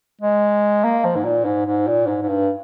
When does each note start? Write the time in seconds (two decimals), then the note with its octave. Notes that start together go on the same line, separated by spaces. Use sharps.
0.21 G#3
0.84 A#3
1.05 F3
1.16 G#2
1.25 A#2
1.45 G#2
1.66 G#2
1.87 A#2
2.07 G#2
2.22 G#2
2.28 G2